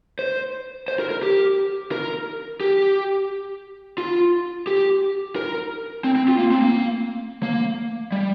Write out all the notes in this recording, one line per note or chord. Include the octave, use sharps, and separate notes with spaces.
C5
C5
A#4
A#4
G4
A#4
G4
F4
G4
A#4
C4
C4
F4
A#3
C4
A#3
A#3
G3